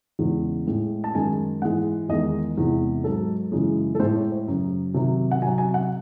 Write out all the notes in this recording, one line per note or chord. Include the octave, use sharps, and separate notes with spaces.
E2 C#3 G#3
A2 G#3
A5
F#2 D#3 G#3 G#5
G#2 E3 G#3 F#5
E2 D#3 G#3 D#5
E2 C3 E3 G#3
G#2 F#3 A4
F#2 C#3 E3 G#3
A4
A2 G#3 C5
C#5
C5
F#2 C#3 F#3
C3 D#3 F#3
F#5
C3 F#3 G#5
G#5
F#5